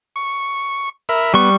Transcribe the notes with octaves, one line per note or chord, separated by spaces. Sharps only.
C#6
A#4 E5 B5
G3 B3 C#6